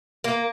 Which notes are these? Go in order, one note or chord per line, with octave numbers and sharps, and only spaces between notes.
A#3